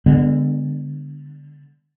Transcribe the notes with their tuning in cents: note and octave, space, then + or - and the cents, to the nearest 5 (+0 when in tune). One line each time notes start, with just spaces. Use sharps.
D3 +0 G#3 -35 B3 +0